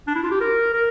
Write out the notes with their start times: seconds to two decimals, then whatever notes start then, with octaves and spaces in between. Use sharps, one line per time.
0.07 D4
0.15 E4
0.23 F4
0.31 G4
0.40 A#4
0.74 A#4